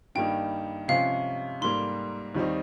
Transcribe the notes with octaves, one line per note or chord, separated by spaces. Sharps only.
G2 D#3 G3 A#3 D#4 G5
C3 F3 G#3 C#4 F5
G#2 G3 A#3 C6
D#2 D#3 G3 C4 D#4